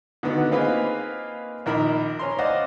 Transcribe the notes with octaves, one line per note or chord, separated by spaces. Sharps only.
D3 D#3 B3 F#4
A#3 C4 D#4 F4 G#4 B4
A#1 D#3 A#4 B5
C#4 A#5 C6
C5 D5 D#5 F5 F#5